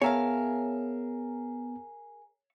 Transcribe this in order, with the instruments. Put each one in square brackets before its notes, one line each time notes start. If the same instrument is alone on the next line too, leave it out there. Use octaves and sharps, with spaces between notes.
[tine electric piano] B3 [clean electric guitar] G#4 A#4 [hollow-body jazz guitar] C#5 E5 F5